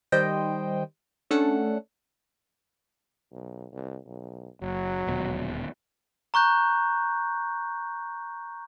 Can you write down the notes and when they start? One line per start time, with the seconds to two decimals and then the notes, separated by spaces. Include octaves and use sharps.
0.12 D#3 G3 C5 D#5 G5
1.30 A3 C#4 D4 A4 F#5
3.32 B1
3.73 C2
4.06 B1
4.62 F#1 F#3
5.07 D#1 D2 B2
6.34 A#5 C#6 F#6 G6